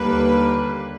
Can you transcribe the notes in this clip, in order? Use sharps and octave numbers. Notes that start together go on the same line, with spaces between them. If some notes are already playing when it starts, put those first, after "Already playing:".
Already playing: D#2 D3 G3 A#3 B4